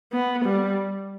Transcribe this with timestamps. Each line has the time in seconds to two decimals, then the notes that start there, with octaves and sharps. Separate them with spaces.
0.13 B3
0.45 G3